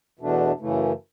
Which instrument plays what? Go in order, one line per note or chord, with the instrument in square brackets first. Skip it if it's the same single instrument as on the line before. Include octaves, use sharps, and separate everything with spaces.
[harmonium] E2 B2 A3 D4
F#2 C#3 E3 A3